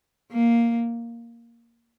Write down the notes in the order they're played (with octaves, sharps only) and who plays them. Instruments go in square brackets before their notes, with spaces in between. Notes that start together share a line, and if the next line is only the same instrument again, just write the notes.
[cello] A#3